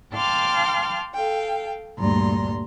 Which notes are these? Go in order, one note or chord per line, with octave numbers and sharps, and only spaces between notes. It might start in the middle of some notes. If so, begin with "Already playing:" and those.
F5 G5 A5 C6 D6 F6
A4 F5 G5
D2 G2 A#2 A#5 C6